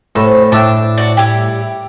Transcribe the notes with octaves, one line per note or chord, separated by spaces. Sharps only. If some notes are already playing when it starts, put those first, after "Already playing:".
F2 A2 C3 C6 E6
A2 D4 C#5 E5 G5 A5
F#4 D5
G3 E4 G4